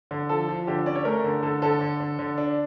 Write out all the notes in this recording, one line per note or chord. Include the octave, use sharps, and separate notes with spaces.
D3
F3 A4
F3
D3 G4
C#4 D5
C#5
A3 A#4
D3
D3 A4
D3 A4
D3
D3
D3
D4